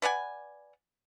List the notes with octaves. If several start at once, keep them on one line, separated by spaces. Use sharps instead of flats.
B4 D5 F#5 G#5